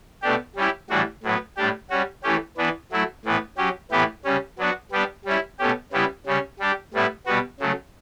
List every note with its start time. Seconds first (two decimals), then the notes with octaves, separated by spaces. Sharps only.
0.22 B2 A3 D4 G4
0.56 G3 C#4 E4 G4
0.90 A2 E3 G3 D4 F#4
1.23 A2 F#3 B3
1.57 A2 G3 D4 G4
1.90 G3 C#4 F#4
2.23 E3 A3 C#4 G4
2.57 E3 B3 D4
2.91 F#3 A3 E4
3.24 A2 E3 B3
3.58 F#3 C#4 G4
3.91 A2 E3 B3 E4 G4
4.25 C#3 G3 C#4
4.58 F#3 B3 D4 F#4
4.91 G3 B3 D4 G4
5.25 G3 C#4 E4
5.59 B2 A3 C#4 G4
5.92 C#3 G3 B3 E4 G4
6.26 C#3 G3 C#4
6.59 G3 D4 G4
6.93 A2 G3 B3 E4
7.26 B2 G3 B3 F#4
7.60 C#3 F#3 A3